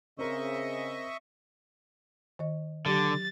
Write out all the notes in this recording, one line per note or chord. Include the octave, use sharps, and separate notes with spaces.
C#3 C4 A#4 C5 D#5 E5 C#6
D#3 D#5
D3 F#3 G4 A6